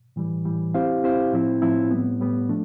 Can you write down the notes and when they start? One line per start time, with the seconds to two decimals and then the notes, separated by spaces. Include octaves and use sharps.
0.16 A2 E3 G3
0.45 A2 E3 G3
0.74 C4 E4 G4 C5 F5
1.03 C4 E4 G4 C5 F5
1.33 A2 F3 C4 E4
1.61 A2 F3 C4 E4
1.91 A2 G3 B3
2.20 A2 G3 B3
2.49 F3 A3 D4